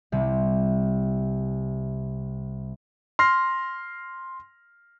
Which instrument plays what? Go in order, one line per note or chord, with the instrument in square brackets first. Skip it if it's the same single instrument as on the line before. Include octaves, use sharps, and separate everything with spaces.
[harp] C2 C3 C4
[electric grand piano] C6 F6 A#6 C7